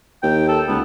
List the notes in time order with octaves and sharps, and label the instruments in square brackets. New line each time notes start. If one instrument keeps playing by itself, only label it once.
[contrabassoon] D#2 [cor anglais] G5
[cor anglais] A4
[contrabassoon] C#2 [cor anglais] B3